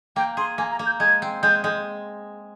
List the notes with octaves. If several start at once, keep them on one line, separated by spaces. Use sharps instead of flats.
A#3 G5
G#4 C6
A#3 G#5
A#5
A#3
G6
G#3 G#6
C4
G#3 G6
G#3